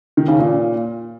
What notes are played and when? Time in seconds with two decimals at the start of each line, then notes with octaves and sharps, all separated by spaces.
0.17 D#3
0.28 C#3
0.39 A#2